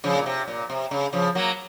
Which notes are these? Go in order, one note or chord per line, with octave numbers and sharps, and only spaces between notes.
C#3 F3
A#2
C3
A#2
C3
C#3
C#3 F3
F#3 A#3